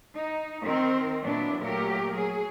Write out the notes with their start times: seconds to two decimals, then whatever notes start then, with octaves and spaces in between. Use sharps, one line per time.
0.14 D#4
0.63 D#3 C4 A#4
1.22 A#2 F#3 B3 D4 E4
1.60 A#2 F#3 A3 G4 A#4
2.14 F#3 G#4